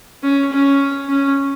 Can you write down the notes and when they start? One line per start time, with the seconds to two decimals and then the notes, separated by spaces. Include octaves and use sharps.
0.23 C#4
0.53 C#4
1.09 C#4